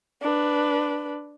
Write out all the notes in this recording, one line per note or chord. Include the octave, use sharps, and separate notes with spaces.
D4 B4